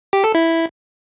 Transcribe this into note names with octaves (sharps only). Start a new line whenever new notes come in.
G4
A4
E4